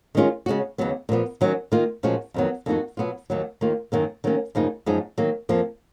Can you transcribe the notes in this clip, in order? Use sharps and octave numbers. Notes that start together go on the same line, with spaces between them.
D#3 G#3 C#4 F4
C#3 G#3 C#4 F#4
D#2 C#3 F#3 B3
A#2 F3 B3
D#3 F#3 C#4
D#3 A#3 F4
A#2 F3 G#3 C#4 F#4
F2 D#3 F#3 B3
F2 D#3 A#3 D#4 F#4
B2 F#3 B3 F4
D#2 D#3 F#3
D#2 D#3 A#3 F4
F#2 D#3 F#3 A#3
D#3 F#3 A#3 C#4
F#2 C#3 F3 A#3 D#4
F#2 F3 G#3 D#4
D#3 F#3 A#3
F2 F3 A#3